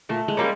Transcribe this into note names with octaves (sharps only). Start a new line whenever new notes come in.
A#2 A3
G#3
G3 A#3 C#4